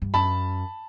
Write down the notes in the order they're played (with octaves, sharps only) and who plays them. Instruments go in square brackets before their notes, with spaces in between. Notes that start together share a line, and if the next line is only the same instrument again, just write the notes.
[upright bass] G2
[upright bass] F#2 [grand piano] A5 B5